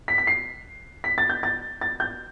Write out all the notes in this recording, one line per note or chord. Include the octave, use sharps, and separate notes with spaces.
B6
B6
C7
B6
A6
G6
A6
A6
G6